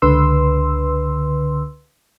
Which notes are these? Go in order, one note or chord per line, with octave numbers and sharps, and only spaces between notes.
C#2 D3 B4 C6 E6